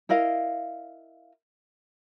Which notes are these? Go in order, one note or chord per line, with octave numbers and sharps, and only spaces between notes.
E4 A#4 D#5 F5